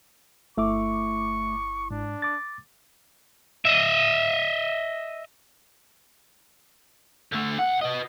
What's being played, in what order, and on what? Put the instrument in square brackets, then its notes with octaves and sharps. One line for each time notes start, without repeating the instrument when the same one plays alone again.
[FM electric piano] G1 E4 D6 [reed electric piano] A3 E5 [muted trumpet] C#6
[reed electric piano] G#2 [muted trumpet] D4
[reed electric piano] D6 A6
[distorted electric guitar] D#5 E5
[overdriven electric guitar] D3 A3
C2 F#5
B4 D#5